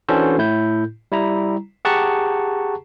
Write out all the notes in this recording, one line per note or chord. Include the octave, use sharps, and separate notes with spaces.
E3 C#4 D4 F#4 A4 C5
A2 E4 G6
G3 E4 A#5
G4 G#4 F#5 A5 A#5 C#6